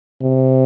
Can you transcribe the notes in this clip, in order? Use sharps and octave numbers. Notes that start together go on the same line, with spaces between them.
C3